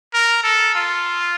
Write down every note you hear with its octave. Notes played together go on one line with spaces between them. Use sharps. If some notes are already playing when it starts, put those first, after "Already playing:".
A#4
A4
F4